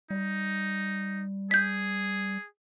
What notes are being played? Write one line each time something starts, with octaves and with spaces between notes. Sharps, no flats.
G3 D#4
G#4 G6 B6